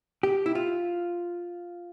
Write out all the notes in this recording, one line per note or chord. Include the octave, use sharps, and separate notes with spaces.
G4
E4
F4